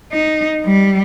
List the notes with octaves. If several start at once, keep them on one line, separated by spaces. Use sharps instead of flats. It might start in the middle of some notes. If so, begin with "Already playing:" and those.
D#4
G3